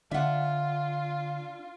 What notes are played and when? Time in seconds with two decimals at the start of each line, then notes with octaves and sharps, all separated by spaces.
0.11 D3 D4 F4 E5 F#5